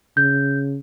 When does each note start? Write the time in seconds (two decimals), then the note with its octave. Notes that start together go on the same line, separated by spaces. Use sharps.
0.17 C#3 G6